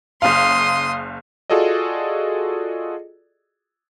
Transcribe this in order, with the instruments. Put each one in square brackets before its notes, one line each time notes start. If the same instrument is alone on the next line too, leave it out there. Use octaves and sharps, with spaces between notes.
[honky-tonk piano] F#1 F5 [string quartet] C6 D#6
[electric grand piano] F4 F#4 G#4 A4 D5 D#5